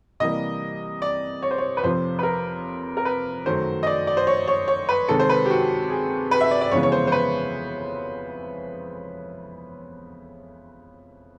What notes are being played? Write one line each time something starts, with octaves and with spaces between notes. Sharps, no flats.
C3 E3 G3 A#3 D#5
D5
C#5
C5
C#5
B4
F2 C3 F3 C5
B4
A#4
A#4
B4
F#2 D#3 F#3 A3 C5
D#5
D5
D5
C5
C#5
C#5
C#5
B4
C3 D#3 G#3 A4
C5
B4
G4
F#4
G#4
B4
E5
D5
D5
F2 C#3 E3 G#3 B3 C#5
C#5
C5
C5
B4